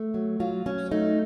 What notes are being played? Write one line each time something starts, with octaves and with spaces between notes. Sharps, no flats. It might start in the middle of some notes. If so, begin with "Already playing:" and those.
Already playing: A3
F#3
F#3 F4
F#3 C#4
A3 D#4